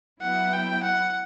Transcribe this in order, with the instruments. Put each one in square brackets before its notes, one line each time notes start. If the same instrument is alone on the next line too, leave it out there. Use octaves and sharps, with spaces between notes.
[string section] F#3 B3 E4 [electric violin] F#5
[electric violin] G5
F#5